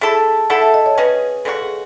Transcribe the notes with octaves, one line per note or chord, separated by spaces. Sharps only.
A3 E4 G#4 A4
A3 E4 A4 F#5
E5
D#5
C#5
C#3 G#3 C#4 G#4 B4
C#3 G#3 D#4 F#4 A4
G#4